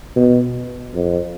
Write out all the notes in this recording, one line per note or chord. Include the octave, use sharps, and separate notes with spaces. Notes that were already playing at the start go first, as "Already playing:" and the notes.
B2
F2